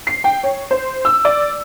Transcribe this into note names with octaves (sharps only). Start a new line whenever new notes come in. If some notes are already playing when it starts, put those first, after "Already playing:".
C7
G5
C#5
C5
E6
D5